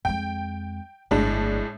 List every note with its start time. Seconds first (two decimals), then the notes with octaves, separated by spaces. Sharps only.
0.05 F2 G#3 G5
1.11 G1 A2 F#3 G#3 D4